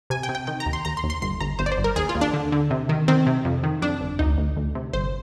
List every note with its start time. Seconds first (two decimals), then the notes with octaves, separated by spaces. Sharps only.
0.10 C3 G#5
0.23 G5
0.29 C3
0.35 G5
0.47 D#3 G5
0.60 A#5
0.66 D#2
0.73 C6
0.85 D#2 A#5
0.97 C6
1.04 D#2
1.10 C6
1.22 G1 C6
1.41 G1 A#5
1.59 G1 C5
1.66 D5
1.72 C5
1.78 G1
1.84 A#4
1.96 D#2 G#4
2.09 F4
2.15 D#2
2.21 D4
2.34 D3
2.52 D3
2.71 C3
2.89 D#3
3.08 D#3 C4
3.27 C3
3.45 F2
3.63 D#3
3.82 F2 D4
4.01 G1
4.19 D2 D#4
4.38 D2
4.57 D2
4.75 C3
4.93 G1 C5